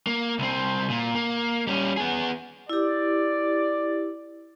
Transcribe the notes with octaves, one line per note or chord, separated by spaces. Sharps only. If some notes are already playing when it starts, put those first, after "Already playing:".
A#3
C2 C4
A#2
A#3
G3 C#4
B3 G#4
E4 G4 D5